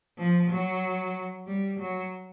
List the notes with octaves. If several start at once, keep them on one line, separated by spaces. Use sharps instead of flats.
F3
F#3
G3
F#3